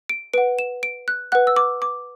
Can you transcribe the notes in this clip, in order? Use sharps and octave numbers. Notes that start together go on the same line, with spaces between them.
D7
B4 F#5 D7
E7
D7
F#6
B4 F#5 F#6
E6
D6
D6